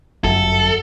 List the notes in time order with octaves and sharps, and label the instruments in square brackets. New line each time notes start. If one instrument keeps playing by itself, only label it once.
[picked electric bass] G1 F#2 [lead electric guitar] A4